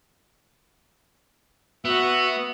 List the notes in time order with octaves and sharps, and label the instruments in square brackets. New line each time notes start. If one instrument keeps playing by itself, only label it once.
[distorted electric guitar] B3 [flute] F#4 [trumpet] E5